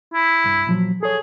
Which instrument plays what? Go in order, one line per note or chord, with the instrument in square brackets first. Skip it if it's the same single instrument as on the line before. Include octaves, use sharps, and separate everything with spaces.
[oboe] E4
[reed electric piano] C2 G2
A#2 F3 F#3
[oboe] G#4 [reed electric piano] A4 C#5